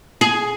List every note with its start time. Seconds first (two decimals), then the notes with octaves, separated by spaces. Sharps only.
0.21 G#4